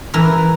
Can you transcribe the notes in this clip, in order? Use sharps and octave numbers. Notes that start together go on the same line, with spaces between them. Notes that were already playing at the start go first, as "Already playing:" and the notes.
E3 A#4